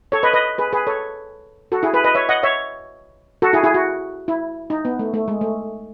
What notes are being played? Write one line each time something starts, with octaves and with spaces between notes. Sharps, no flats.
A4 C#5
B4 D#5
B4 D#5
G#4 B4
G#4 B4
A4 C#5
F#4 A4
E4 G#4
G#4 B4
B4 D#5
C#5 E5
D#5 F#5
C#5 E5
F#4 A4
E4 G#4
E4 G#4
F#4
E4
D#4
B3
A3
A3
G#3
A3